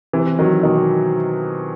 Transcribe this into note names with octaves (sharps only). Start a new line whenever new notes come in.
C3 E3
D#3 F#3
B2 D#3